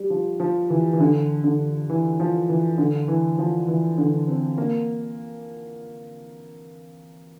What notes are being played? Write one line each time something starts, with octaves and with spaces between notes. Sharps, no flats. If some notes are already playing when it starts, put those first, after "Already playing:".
Already playing: G3
F3
F3
E3
E3
D3
D3
E3
F3
E3
D3
E3
F3
E3
D3
C4
A#3